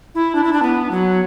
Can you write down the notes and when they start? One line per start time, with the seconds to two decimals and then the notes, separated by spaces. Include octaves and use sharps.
0.15 E4
0.35 D4
0.44 E4
0.53 D4
0.62 B3
0.91 F#3